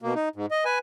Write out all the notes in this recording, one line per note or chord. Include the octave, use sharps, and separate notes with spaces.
B2 A#3
D#4
G#2
D#5
B4 G#5